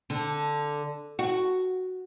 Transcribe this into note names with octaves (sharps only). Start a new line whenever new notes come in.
D3
F#4